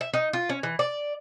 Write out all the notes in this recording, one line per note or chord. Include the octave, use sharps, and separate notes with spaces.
E5
D#4
F4
C#4
E3
D5